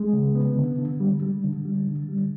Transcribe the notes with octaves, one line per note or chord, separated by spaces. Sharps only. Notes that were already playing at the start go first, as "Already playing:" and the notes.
Already playing: G#3
C#3
B3
D3
D3
G3
G3
D3
G3
D3
G3